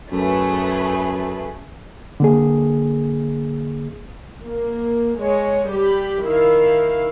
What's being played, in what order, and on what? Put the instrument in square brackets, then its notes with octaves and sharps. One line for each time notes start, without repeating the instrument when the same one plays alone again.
[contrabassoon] F#2 [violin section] A3 G#4 B4
[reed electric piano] D3 A#3 G#4
[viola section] A#3
G#3 C#5
G3 G4 B5
D#3 E4 F5